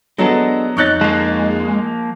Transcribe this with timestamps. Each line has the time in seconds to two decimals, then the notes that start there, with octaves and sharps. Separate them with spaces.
0.18 F#3 G#3 B3 D4 A4
0.77 F2 D#4 C#5 C#6 F#6 A6
1.01 F3 G#3 A#3